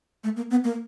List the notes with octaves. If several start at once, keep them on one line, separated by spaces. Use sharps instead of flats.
A3
A#3
B3
A#3